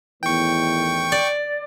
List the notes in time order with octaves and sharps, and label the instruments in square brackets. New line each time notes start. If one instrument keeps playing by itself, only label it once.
[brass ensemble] E2 A2 D#3 [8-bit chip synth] G5 C#6
[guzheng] D5